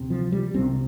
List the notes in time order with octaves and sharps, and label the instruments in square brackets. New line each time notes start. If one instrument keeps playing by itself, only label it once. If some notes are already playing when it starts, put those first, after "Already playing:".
Already playing: [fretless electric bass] D2 C3
F3
G3
C2 C3 C4